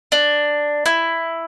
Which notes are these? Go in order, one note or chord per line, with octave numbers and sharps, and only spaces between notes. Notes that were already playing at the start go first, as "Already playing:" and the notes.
D4
E4